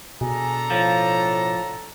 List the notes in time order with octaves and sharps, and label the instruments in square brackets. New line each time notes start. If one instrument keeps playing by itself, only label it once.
[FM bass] B2 [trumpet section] D4 A4 A#5 [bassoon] G#4
[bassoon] A2 [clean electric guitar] F3